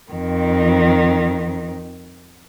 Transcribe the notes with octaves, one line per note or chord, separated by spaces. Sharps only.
F2 D#3